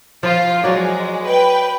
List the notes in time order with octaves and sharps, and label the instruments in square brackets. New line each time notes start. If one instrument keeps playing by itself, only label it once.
[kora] F3 [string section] F4
[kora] F#3 D5 [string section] G#3
[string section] B4 G5